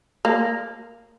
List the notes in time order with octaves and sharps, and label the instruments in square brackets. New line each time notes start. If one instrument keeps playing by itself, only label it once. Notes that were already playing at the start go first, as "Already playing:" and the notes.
[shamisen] A#3